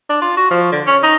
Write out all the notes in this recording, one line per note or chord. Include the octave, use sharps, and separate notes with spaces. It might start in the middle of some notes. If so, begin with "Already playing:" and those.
D4
F4
F#4
F3
D3
C#4
D#4